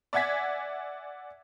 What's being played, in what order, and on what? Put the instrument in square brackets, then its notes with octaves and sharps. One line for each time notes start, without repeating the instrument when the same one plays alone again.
[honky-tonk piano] D5 E5 F#5 G#5 G#6 B6